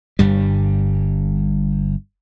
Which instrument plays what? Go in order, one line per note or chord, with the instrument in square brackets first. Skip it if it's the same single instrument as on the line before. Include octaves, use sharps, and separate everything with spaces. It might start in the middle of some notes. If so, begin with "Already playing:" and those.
[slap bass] G1 G2 G3